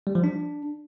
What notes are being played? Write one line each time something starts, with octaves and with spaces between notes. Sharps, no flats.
G3
F3
D4